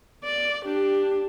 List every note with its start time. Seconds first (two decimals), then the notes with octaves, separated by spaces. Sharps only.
0.24 D5
0.65 D4 G4